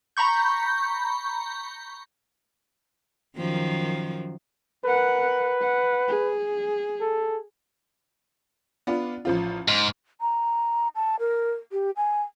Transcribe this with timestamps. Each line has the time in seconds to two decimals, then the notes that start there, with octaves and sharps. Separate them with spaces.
0.17 A#5 B5 C#6 G6
3.37 F#2 D#3 F3
4.85 A#4 B4 F#5
5.62 F#5
6.08 G#4
7.01 A4
8.87 B3 D4 F4
9.25 A1 F3 F4
9.68 G#2 F6
10.21 A#5
10.95 A5
11.19 A#4
11.72 G4
11.96 G#5